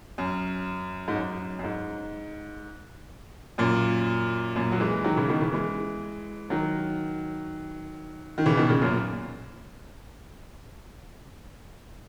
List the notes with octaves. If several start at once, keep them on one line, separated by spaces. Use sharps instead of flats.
F#2
G#2
F#2
F#2
G#2
F#2 A#2
F#2 A#2
F#3
E3 G#3
D#3 F#3
C#3 E3
B2 D#3
C#3 E3
E3 G#3
D#3 F#3
D#3
C#3 E3
B2 D#3
A#2 C#3
F#2 A#2